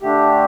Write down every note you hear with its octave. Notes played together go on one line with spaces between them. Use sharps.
D3 A3 D4 G4